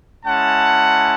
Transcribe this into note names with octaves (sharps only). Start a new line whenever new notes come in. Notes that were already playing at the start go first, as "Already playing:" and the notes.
G#3 C#4 E4 F#5 A5